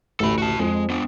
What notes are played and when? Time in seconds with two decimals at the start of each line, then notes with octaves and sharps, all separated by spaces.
0.20 A1 D2 A4 B5
0.38 F#4 A5
0.59 F2 G#3
0.90 B3 D4